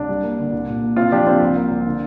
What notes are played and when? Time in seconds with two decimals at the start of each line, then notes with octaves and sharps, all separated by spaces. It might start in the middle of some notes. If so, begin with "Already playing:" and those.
Already playing: C2 D4
0.09 G3
0.23 A#3
0.38 D3
0.53 C2
0.68 A#2
0.82 A#3
0.96 C3 C4 F4
1.12 F3 D4 G4
1.27 F3 C4 F4
1.42 C2
1.56 A#3
1.71 C2
1.85 D3